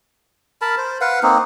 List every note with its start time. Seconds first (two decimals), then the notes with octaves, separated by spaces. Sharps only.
0.61 A#4 A5 B5
0.78 C5
1.01 B4 F5 F#5
1.23 A#3 C4 D#4